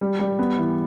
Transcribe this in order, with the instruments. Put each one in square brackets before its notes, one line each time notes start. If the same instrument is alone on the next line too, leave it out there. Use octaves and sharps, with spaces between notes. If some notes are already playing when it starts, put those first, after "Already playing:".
[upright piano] G3
G3
B3
E3